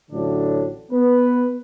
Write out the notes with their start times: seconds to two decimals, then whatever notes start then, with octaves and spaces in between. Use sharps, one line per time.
0.11 A1 A2 D3 F#3 A3 D4
0.92 B3 B4